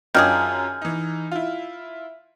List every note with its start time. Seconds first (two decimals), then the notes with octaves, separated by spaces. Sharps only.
0.14 F#2 D#3 C#4 D4 F4 G#4 F6 G6
0.82 E3 D#4
1.31 E4 F4